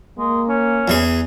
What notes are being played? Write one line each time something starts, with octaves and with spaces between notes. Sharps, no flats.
G#3 A#3
C#4
E2 E3 G#4